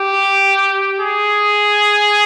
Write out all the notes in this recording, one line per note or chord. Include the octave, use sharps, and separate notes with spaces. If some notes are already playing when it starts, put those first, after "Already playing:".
Already playing: G4
G#4